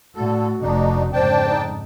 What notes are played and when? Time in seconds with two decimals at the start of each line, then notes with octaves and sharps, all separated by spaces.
0.15 A2 D3 F#4 A4
0.62 F1 F2 D4 D#4
1.13 F2 G#2 C#3 D4 C5 G5 A5
1.49 D#4